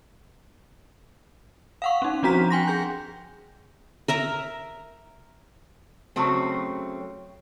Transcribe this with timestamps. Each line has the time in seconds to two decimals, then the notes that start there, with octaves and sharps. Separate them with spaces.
1.82 F5 F#5 C#6
2.02 C#4 D#4
2.23 F3 C4 D4 F#4 A#5 B6
2.50 G5 G#5 C6 A#6
2.68 G#4 G6
4.08 A#4 E5 A#5
6.16 C#3 F#3 A3 C4